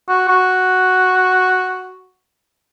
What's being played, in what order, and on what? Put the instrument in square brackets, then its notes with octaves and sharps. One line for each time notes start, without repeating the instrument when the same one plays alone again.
[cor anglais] F#4
F#4